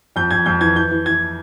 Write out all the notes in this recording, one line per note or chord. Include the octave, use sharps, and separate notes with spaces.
F2 G6
F2 G#6
F2 G6
E3 G#6
E3 G6
E3
E3 G#6